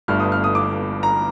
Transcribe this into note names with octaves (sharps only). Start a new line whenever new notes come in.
G1 G2 D3 A3 F6
D#6
F6
D#6
D6
A#5